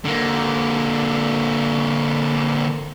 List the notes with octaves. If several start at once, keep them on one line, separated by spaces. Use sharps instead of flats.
D3 A#3